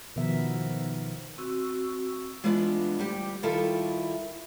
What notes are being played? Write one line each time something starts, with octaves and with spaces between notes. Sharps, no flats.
B2 D#3 F3 B3 A#4 E5
C4 F#4 C#6 E6
E3 G#3 B3 D4 F4
D2 G3 G4
D#3 G3 E4 F4 A4